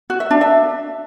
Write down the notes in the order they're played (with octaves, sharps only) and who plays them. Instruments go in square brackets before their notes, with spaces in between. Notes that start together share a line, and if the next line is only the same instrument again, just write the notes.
[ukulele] F#4
E5
D4
E5